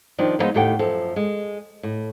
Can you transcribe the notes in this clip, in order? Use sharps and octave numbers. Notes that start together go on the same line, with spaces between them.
D#3 F3 G3 D4
D3 F3 F#3 G#3 B3 D#4
D#2 A2 G4 A4 F#5 G5
F#2 F3 A4
G#3
A2